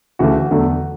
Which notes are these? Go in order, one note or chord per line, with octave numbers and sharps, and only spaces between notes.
D2 C#3 E3 A3 F#4
E2 D3 F#3 A3